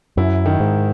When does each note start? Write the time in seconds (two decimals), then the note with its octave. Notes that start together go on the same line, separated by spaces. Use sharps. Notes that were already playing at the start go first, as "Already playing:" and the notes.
0.17 F#2 E4
0.46 D#3
0.60 G#2